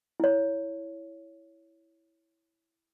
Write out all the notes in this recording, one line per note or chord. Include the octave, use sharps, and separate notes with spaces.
E4 C#5